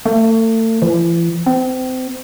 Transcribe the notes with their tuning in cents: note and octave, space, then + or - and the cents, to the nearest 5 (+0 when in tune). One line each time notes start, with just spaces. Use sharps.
A3 +35
E3 +40
C4 -30